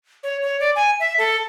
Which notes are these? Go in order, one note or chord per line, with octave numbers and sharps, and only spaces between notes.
C#5
C#5
D5
G#5
E5
A4